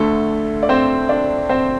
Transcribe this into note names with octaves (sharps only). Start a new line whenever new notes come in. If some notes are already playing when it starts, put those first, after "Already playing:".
Already playing: D2 D3 A3 A4
D5
C4 C5
D4 D5
C4 C5